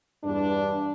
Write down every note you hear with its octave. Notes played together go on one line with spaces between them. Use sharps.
E2 G2 D4